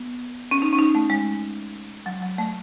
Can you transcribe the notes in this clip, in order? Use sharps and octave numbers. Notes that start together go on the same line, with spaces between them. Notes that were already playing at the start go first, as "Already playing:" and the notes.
Already playing: B3
C#4
D#4
C#4
D#4
A3
G#3
F#3
F#3
A3